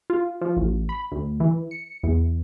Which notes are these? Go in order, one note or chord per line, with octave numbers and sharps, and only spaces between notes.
F4
F3
A1
B5
D2
E3
C#7
E2